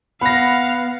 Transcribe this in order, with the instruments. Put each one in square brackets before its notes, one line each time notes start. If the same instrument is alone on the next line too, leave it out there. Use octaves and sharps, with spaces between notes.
[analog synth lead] B3 [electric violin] F5 [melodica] F#5 [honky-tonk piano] B5 A#6